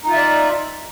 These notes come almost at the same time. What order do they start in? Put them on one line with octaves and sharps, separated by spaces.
D#4 F4 E5 D5